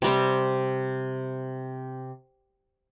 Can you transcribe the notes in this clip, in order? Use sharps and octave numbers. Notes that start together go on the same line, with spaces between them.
C3 G3 C4